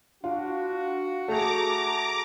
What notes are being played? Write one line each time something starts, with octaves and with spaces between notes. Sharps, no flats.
D4 F4 F#4
A3 G#4 A5 A#5 D6